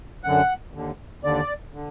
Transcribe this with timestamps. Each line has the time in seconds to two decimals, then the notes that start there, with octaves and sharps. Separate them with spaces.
0.24 F#2 D3 F#5
0.74 D#2 D3
1.24 D#2 D3 D5
1.73 D3